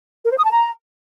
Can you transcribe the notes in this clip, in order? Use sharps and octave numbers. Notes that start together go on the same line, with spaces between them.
A#4
C5
D#6
A5
A#5